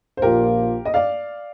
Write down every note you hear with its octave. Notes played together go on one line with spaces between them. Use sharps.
C5
A#1 A#2 F3 A#3 F4 G4 A#4
D#5
D5 F5